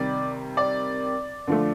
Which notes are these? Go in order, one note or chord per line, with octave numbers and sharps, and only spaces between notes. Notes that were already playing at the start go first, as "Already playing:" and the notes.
Already playing: C3 D#3 G3 D5
D5
D3 F3 A3